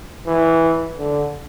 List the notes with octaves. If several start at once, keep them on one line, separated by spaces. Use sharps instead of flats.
E3
D3